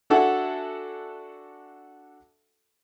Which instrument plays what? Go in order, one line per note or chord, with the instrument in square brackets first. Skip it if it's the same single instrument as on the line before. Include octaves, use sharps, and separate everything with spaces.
[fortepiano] D4 F#4 A4 E5 F#5 G#5